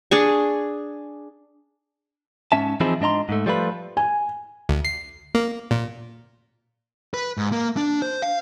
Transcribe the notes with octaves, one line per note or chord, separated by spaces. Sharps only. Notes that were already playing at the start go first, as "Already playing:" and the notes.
D4 G#4 C#6
G#2 C#4 E5 A5
E3 F3 C4 D#4 E4 G#4
G#2 D4 D#5 A#5 C6
G#2 A3
F3 G3 A3 F4 B4
G#5
D2
C7
A#3
A#2
B4
G#2
A#3
D4
C5
F5